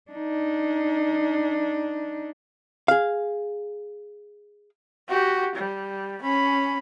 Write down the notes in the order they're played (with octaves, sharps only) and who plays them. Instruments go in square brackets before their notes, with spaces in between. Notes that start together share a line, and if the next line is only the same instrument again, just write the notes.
[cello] D4 D#4
[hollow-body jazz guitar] G#4 F5
[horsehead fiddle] F#4 G4
G3
C#4 B5